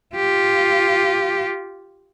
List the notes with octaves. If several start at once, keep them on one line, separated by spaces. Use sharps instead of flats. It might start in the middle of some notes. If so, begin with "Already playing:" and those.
F4 G4